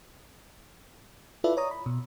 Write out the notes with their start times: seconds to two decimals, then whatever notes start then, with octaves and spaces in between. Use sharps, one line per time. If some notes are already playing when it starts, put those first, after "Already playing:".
1.44 E4 F4 A4 B4 D5 E5
1.57 C#5 D5 A#5 D#6
1.71 B5
1.86 B2